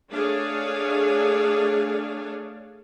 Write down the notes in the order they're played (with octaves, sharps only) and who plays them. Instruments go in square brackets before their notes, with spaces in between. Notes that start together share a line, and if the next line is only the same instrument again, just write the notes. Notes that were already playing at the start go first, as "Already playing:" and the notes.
[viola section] A3 D4 G#4 C#5 F5